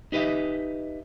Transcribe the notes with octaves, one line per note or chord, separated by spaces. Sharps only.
D#4 G4 B4 D#5 E5